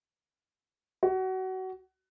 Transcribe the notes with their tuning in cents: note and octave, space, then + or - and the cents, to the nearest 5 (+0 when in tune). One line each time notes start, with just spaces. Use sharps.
F#4 +25